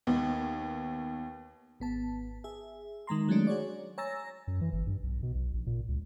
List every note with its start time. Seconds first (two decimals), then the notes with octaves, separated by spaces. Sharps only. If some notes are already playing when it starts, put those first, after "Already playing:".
0.07 D#2 B3
1.80 G#1 B3 A5
2.44 G#4 E5
3.07 D#3 G#3 A#5 C6
3.28 D#3 F#3 G#3 A3 C#4 D4
3.47 F#4 G#4 C#5 D5
3.98 C#5 G#5 A#5 E6 A6 A#6
4.47 F#2
4.61 E3
4.73 G1
4.87 G2
5.03 B1
5.23 B2
5.35 B1
5.54 A#1
5.67 A#2
5.88 C#2